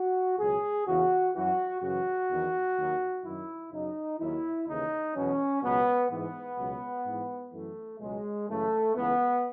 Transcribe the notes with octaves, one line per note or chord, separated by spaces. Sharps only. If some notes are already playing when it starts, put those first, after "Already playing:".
Already playing: F#4
C#2 B2 F#3 G#4
E2 C#3 E3 F#4
F#2 E3 F#4
F#2 C#3 E3 F#4
E2 D#3 F#3
D#2 D#3 F#3
F#2 D#3 F#3 E4
F#2 C#3 F#3 D#4
D#2 D#3 F#3 E4
D#2 C#3 E3 D#4
E2 B2 F#3 C#4
C#2 B2 F#3 B3
G#2 E3 B3
C#2 B2 F#3
G#2 E3
F#2 E3 A3
C#2 B2 F#3 G#3
F#2 C#3 E3 A3
C#2 C#3 E3 B3